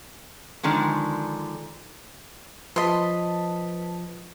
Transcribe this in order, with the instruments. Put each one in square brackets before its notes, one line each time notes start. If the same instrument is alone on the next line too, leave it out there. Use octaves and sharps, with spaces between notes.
[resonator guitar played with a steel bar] D3 D#3 F3 G#3
[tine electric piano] F3 [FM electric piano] B4 A5 B6 [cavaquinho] D#5 C6